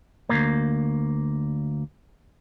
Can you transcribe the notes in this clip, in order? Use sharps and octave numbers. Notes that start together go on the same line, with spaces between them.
D2 G#2 A#3